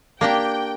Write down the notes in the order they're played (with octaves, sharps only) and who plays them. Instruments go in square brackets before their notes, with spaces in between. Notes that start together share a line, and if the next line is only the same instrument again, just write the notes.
[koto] A#3 D4 G4 [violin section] G5